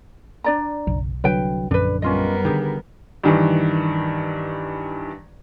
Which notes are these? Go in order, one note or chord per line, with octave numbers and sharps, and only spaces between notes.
D4 D5 A#5
F#1 B1
C2 D3 F#3 B4 G5
A#1 F#2 D3 D4 B4
G3 B3 C#4 F4 A#4 D#5
D3 D#3 G4 G#4
G2 D#3 E3